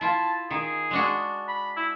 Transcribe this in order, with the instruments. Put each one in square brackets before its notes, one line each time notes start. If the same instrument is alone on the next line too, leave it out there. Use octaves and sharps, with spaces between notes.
[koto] E4 F4 [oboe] A5
[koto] D#3 [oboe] G#4
[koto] G#3 D4 F#4
[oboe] B5
E4